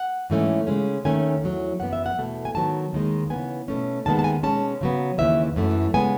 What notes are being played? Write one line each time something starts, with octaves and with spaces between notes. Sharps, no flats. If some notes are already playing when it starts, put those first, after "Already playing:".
Already playing: F#5
G#2 E3 A3 C#4
C#3 G#3 C#4
D#2 D#3 A3 C#4 G#5
E2 D#3 F#3
F#2 E3 B3 F#5
E5
F#5
E2 B2 A3
G#5
G#2 D#3 F#3 B3 A5
D#2 D#3 G#3
C#3 E3 B3 G#5
B2 A3 C#4
D#2 D#3 G#3 B3 A5
A5
G#5
B2 G#3 C#4 A5
C#3 F#3 B3
D#2 C#3 E3 E5
F#2 E3 A3
C#3 G#3 B3 G#5